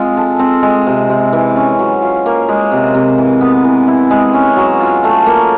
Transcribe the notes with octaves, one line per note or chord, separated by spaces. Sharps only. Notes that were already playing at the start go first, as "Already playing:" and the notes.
Already playing: G#3 C4 F4
A4
C4
G#3
C3
C3
E3
C#4
F#3
F4
A#3
G#3
C3
C3
E3
B3
E3
E4
G#3
C#4
F#3
F4
A3
A#3